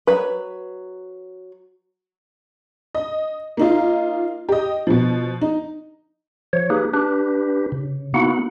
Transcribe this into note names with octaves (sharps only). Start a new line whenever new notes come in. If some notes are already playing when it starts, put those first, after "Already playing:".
F#3 B4
D#5
A#3 D#4 F4
G4 D#5
B2 F3
D#4
F3 C#5
A#3 D#4 G4 G#4 B4
D4 G4 B4
C#3
A#3 B3 D#4 E4 F#4 F#5